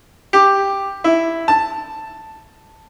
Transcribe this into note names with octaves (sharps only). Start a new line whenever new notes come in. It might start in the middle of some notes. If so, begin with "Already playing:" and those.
G4
E4
A5